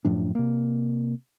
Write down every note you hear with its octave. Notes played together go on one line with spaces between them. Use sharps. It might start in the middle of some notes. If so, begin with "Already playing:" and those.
F#2 A2 F3 D4
C3 A#3